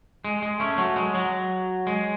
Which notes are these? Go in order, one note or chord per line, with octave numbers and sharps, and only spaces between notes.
G#3
G#3
A3 C#4
F#3 A3
G#3
F#3
G#3